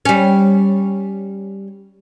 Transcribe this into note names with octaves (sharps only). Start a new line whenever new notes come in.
G3 C#4